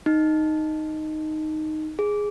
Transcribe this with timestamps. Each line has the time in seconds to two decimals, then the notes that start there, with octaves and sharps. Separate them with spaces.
0.06 D#4
1.99 G#4